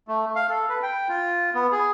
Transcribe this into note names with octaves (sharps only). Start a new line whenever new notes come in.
A3
F5
A4
B4
G5
F4
B3
G#4